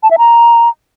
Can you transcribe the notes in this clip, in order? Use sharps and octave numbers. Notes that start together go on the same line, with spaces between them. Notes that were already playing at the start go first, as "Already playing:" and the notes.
A5
E5
A#5